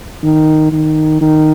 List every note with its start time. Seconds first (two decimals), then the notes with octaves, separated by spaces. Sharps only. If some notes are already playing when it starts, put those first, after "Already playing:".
0.24 D#3
0.72 D#3
1.21 D#3